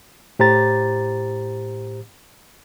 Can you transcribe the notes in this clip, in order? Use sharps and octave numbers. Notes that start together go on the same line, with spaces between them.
A2 G4 C5 A#5 A6